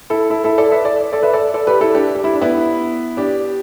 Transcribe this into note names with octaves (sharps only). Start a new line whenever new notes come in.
E4 A4
E4 A4
E4 A4
A4 D5
B4 E5
A4 D5
A4 D5
B4 E5
A4 D5
A4 D5
G4 B4
E4 A4
D4 G4
G4
E4
D4
B3 E4
D4 G4